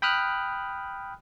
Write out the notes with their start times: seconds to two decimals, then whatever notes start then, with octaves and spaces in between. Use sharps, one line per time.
0.02 G5 B5 D#6 F6 F#6